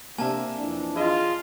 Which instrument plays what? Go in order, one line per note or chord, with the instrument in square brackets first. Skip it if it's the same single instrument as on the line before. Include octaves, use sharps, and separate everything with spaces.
[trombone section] C3 D4 [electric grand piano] A#3 E5 [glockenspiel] G#5 A5
[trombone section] F2 E3 D4
[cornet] F4 [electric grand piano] G#4 D#5